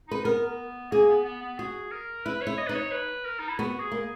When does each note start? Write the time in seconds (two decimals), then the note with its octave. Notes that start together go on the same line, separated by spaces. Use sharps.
0.08 D#4 B4
0.25 B3 A#4
0.91 A#3 G#4
1.09 B3
1.25 B3
1.42 B3
1.59 F#4 G#4
1.91 A#4
2.26 E4 B4
2.42 E4 C#5
2.58 D#5
2.67 D#4 B4
2.75 C#5
2.92 B4
3.25 A#4
3.39 D#4
3.49 E4
3.59 B3 F#4
3.80 G#4
3.92 A#3